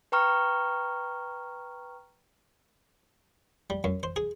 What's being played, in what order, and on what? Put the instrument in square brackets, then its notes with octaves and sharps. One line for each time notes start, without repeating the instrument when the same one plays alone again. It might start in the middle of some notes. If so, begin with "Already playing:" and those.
[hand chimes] B4 G5 A#5 C#6 F6
[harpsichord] G3
F#2
C5
G#4